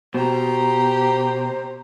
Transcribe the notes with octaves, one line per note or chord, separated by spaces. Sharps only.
B2 G4 C5 A#5